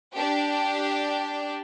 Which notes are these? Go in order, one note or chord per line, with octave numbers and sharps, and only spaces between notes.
D4 G4